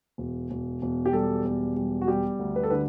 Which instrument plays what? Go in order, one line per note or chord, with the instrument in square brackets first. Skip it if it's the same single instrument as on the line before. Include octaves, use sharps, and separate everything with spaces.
[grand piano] E1
E1
E1
G4
G3 A4
E1
G3
F#4
G3 G4
D2
B4
A4
D3 B4